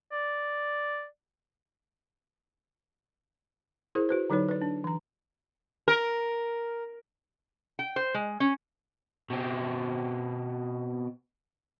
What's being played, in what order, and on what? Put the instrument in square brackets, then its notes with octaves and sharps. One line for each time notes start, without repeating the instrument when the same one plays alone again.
[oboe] D5
[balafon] E4 G#4 A#4 C5
F#4 B4 C5
D3 F#3 D#4 B4 C#5
B4 D5
D4
E3 A#5
[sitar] A#4
[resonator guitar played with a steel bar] G5
C5
G#3
C#4
[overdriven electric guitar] B2 C4